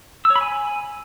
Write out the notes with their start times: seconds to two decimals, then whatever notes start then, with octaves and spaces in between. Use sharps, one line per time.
0.25 E6
0.30 C#5
0.36 B5
0.41 G#5